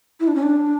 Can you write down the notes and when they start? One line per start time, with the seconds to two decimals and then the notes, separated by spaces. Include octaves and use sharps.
0.20 E4
0.28 D4
0.35 C#4
0.43 D4